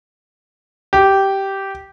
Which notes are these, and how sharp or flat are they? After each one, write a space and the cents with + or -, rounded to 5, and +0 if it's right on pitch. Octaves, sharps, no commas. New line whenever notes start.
G4 -10